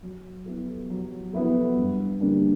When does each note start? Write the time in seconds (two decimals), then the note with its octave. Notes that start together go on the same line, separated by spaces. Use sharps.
0.03 F#3
0.46 B3 E4 A4
0.90 F#3
1.33 B3 E4 A4
1.77 G2
2.20 D3 G3 A#3 D4